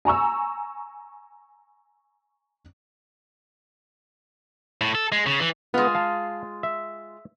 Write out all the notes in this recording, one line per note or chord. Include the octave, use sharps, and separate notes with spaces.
G#5 A#5 C#6 E6
A2
A4
G#3
C#3
E3
G#3 B3 F4
F5 A5
E5